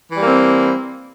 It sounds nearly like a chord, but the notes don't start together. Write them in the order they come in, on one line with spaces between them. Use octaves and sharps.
E3 G3 A#3 C4